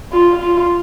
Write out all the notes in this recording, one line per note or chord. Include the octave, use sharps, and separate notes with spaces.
F4
F4